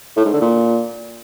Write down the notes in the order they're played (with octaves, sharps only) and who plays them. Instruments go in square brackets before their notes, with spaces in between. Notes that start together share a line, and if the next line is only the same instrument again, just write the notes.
[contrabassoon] A2
G#2
D3
A#2